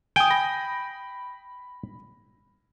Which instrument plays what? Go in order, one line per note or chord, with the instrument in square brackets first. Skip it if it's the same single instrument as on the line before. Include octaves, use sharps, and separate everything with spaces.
[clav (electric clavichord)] G5 [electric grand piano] G#5 D#6
[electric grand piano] B5 A#6